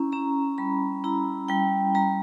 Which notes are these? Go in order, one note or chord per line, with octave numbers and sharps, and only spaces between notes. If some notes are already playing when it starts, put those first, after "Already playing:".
Already playing: C#4 E4 A#5
C#4 A#5
G3 B5
E4 A#5
G3 G5
G3 A#5